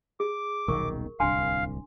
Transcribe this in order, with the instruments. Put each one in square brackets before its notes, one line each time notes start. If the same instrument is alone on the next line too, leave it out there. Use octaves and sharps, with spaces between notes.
[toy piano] G#4 [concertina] D6
[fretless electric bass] D#1 B1 D#3 [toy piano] A#4 C#6
[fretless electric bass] D1 C2 [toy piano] D4 G#5 C6 [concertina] F5